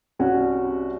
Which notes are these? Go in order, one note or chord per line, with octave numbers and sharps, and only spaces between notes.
C2 C#4 F#4